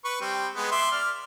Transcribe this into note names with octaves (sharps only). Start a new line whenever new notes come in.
B4 C#6
G3 C4
G#3 B3
E5 C6 D6
D5 F6